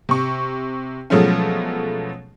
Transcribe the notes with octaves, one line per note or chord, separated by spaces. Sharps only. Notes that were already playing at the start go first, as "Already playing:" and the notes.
C3 C#6
B2 F3 F#3 G#3 A3 C#4